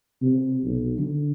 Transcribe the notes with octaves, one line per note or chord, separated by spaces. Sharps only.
C3
B1
D3